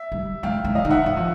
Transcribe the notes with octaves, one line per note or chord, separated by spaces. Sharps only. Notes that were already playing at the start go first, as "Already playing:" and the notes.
Already playing: E5
G3
F3 F5 G5
E3
D#5 F5
D#3
E5 F#5
E3
F3